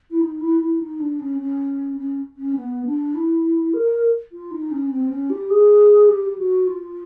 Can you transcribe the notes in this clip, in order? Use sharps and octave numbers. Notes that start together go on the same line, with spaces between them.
E4
D#4
E4
E4
D#4
D4
C#4
C#4
C#4
C#4
B3
D4
E4
A#4
F4
D#4
C#4
C4
C#4
G4
G#4
G4
G4
F#4
F4